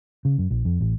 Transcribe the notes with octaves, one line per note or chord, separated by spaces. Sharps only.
C#3
F#2
A#1
F2
A1